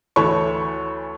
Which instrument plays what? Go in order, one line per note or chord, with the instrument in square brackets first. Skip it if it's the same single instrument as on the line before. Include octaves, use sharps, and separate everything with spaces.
[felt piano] D2 E3 A4 C#5 B5 C#6